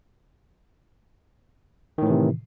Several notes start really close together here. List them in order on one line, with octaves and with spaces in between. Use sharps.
D#3 A2 E3 C3